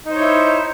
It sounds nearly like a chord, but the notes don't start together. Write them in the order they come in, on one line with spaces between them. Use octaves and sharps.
D#4 C5 C#5 E4